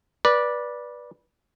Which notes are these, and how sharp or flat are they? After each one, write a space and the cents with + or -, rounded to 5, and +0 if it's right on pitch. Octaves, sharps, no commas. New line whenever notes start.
B4 -20 D5 +0